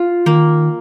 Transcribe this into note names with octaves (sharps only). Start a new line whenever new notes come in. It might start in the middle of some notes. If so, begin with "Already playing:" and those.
Already playing: F4
D#3 A#3